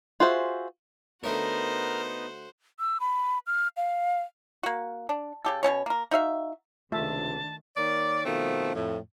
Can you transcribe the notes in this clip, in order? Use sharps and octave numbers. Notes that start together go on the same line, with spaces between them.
F4 F#4 G#4 C5 E5
D3 A3 B3 D#4 F#4 A#4 C5 C#5
E6
B5
F6
F5
A#3 F#4
D4
C#3 G4 A4
B2 B3 C#4 C#5
A#3 A#4
D#4 F#4 E5 F5
C#2 C3 D#3 A3 D4 F4 E5 A5
D#3 A#3 C#5 D5
B2 D#3 F3 A3 C4
F2 A2